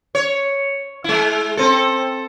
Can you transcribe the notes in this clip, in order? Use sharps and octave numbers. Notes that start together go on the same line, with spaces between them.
C#5
G#3 E4
C4 A4